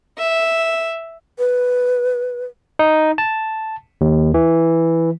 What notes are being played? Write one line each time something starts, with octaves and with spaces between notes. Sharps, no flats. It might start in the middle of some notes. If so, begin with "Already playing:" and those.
E5
B4
D#4
A5
D#2
E3